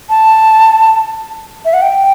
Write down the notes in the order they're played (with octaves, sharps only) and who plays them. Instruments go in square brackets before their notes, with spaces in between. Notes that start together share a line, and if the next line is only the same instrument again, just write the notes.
[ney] A5
E5
F#5
G5